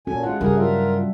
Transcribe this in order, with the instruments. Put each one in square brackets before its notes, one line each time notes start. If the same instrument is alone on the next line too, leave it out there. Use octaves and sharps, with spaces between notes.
[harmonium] A#2 G#5 [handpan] C#4 F#4 A4
[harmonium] G#3 F4 [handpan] E4 F#5
[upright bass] G2 C#3 [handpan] G3 [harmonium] G#4 A#4
[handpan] F#3 E5 [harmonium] F4 A#4